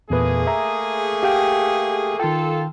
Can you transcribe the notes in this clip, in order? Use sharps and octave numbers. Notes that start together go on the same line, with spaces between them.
E2 A#2 A3 A#3 G#4 B4
E5 A#5
G4 F5 G5
D#3 F4 A4 G5